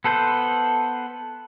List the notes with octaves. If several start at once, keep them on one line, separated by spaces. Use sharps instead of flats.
B3 A4 B4 C5 G6